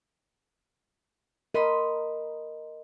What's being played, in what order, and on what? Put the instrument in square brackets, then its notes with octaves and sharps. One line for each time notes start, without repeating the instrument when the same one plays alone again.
[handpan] A#4 [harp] D#5 B5 C6